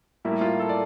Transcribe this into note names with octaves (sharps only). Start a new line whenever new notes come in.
A2 G3 A#3 E4
F4
A4
D5